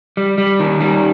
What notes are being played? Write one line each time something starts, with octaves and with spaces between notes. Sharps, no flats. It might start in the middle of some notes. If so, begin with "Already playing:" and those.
G3
G3
D#3
G3